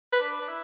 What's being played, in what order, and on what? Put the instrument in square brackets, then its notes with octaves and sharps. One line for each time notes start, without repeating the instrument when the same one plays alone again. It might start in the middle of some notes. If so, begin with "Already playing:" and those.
[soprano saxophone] B4
[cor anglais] D4
D4
E4